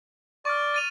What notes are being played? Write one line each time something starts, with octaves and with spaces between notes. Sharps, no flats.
D5 C#6 F6
A6 D#7 F7